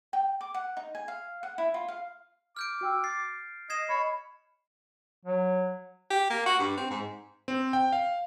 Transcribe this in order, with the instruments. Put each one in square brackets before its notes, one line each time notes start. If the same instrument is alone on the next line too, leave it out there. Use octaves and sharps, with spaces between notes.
[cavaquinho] G5
D6
F#5
D#4
G#5
F5
F#5
E4
F4
F5
[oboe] D6 [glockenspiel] F6 G6 D7
[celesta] F#4 G5 E6
[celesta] A6 [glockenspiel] C7
[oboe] D#5 [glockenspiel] G#6 C7 E7
[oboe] C#5 [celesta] D#5 [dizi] B5
[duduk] F#3
[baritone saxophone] G4
A#3
F#4
G2
C4
G#2
[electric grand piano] C4
G5
F5